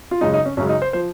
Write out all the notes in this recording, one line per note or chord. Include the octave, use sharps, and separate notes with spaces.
F4
F#2 C#3 G#3 D#4
D#4
C#4
F#2 C#3 G#3 C#4
D#4
C5
F3 C5